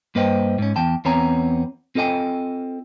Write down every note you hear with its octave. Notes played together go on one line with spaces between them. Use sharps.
G2 A#3 B4 C5 D#5 G5
G#2 C#4
E2 G5 A5
E2 B3 C4 C#5 G#5 A#5
C4 F4 A4 D#5 G5 G#5